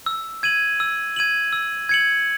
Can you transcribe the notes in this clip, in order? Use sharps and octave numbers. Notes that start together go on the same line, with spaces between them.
E6
G#6 D#7 F#7
E6
G#6 D#7 F#7
E6
G#6 C#7 F#7